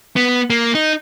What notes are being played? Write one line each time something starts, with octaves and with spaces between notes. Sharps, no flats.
B3
A#3
D#4